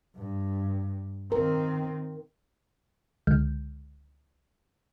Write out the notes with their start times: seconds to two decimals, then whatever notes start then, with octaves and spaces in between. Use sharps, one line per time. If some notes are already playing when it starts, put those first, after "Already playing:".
0.16 G2
1.32 D#3 C4 A#4
3.27 C#2 D3 G#3 F6 G6